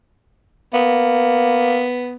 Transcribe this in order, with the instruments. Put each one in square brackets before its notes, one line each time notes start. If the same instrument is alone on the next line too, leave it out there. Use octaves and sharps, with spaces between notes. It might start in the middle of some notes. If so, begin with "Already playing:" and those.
[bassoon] A#3 [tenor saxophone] B3